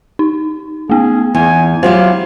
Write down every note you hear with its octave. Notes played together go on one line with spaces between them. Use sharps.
D#4
A3 B3 G#4
E2 G#5
F#3 E4 F4 G4 C5